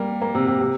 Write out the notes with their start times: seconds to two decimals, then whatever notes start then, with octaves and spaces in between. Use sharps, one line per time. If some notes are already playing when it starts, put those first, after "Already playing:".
Already playing: G3 A#3
0.21 A#3
0.35 C3
0.47 C3
0.61 C3